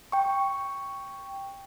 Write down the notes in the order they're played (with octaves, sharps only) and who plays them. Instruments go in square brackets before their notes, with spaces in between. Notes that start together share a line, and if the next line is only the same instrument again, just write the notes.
[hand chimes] G5 C#6